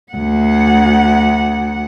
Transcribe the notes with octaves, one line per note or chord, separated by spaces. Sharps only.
D2 F#5